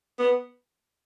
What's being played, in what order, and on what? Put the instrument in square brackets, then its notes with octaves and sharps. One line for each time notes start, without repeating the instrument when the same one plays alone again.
[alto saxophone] B3